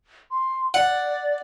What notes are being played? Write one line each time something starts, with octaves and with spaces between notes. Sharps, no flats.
C6
D5 F#5